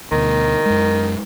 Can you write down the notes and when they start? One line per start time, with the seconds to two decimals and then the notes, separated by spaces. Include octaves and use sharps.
0.12 D2 B2 D#3
0.66 F#2 G#3